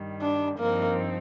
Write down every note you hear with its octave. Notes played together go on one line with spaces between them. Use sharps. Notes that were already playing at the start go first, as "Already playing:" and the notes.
Already playing: G2 D#3 G3
D4
G2 F3 A#3 C4 D#4